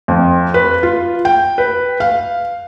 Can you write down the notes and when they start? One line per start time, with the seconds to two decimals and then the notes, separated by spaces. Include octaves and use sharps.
0.08 F2
0.54 B4
0.83 F4
1.25 G5
1.58 B4
2.00 F5